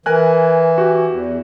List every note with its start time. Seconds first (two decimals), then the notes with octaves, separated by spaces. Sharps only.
0.06 E3 A#4 G#5 F#6
0.78 F#4 G4
1.10 E2